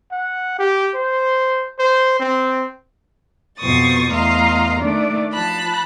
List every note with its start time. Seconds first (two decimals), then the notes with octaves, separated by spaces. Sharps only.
0.12 F#5
0.59 G4
0.95 C5
1.79 C5
2.20 C4
3.58 F2 B2 C5 C#6 D#6 A6
4.10 E2 A3 D#5 F5 A#5 C6
4.80 D#3 A3 D4 D5
5.34 F3 A5 B5 F#6